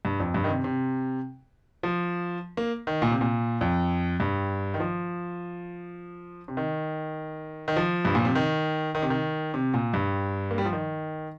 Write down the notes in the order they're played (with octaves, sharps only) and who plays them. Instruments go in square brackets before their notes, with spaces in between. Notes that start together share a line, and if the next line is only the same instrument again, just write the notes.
[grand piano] G2
F2
G2
D#3
C3
C3
F3
A#3
D#3
A#2
C3
A#2
F2
G2
D#3
F3
C3
D#3
D#3
F3
G2
A#2
C3
D#3
D#3
C3
D#3
C3
A#2
G2
A#3
G3
F3
D#3